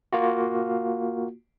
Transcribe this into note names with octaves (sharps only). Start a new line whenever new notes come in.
A#3 F4 F#4